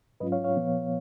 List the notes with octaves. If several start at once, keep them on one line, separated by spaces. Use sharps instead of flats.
G#2 F#3 C#4 F4 B4 D#5
C#5 F5
C#5 F5
A#2 F3 B3